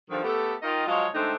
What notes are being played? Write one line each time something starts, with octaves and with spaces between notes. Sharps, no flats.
G2 D3 D#3 F3
A3 B3 G4 A4
D#3 F4 D#5
F3 F#3 G#3 C#5 D#5 F5
D#3 G#3 A3 C4 D4 D#4